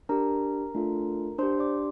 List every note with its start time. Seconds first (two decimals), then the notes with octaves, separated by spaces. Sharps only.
0.09 D4 G4 A#4 A#5
0.75 A3 D4 F4 A4
1.38 D4 G4 C5 C6
1.53 C6
1.59 D5 D6